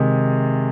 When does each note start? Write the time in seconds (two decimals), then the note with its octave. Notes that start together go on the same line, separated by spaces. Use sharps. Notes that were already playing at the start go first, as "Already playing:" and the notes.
Already playing: C3 D#3 G#3